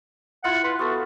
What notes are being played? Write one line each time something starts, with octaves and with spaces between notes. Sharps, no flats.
E4 F4 F#5
B4 C6
B3 F#4 A4